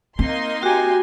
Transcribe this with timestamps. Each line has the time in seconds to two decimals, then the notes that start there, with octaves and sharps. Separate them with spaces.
0.19 A#3 C4 D#4 C6
0.63 F#4 G4 G#5